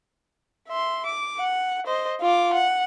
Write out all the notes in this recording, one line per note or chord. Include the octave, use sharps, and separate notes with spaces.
E5 C6
D6
F#5
C5 D#5
F4 D6
F#5